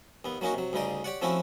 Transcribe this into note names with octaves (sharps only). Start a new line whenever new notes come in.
D#2 B3
F#3 A#3 C#4 D#4 F#4
C3 F#3
D2 G2 C#3 D#4 D5
G4 C#5 D5 F#5
F3 A3 C4 C#4 E4 F#4